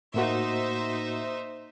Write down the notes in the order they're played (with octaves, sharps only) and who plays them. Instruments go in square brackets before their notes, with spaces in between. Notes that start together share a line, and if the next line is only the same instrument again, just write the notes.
[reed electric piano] A2 A#3 F#4 [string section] D#4 C5 E5